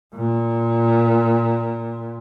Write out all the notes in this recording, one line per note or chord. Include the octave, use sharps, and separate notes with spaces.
A#2